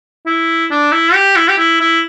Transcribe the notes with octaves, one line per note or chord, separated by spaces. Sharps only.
E4
D4
E4
G4
E4
G4
E4
E4